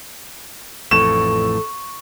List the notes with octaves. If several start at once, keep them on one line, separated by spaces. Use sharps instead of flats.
A1 F2 A2 A4 C#6 E7